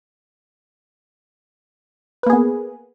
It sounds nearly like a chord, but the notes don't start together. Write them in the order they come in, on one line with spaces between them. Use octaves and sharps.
B4 A#3 G#4 B3